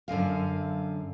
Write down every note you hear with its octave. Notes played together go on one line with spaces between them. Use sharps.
F#2 D3 D#3 F5